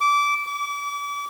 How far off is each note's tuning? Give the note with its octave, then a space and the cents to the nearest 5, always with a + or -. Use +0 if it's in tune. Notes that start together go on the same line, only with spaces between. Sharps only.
D6 -20
D6 -40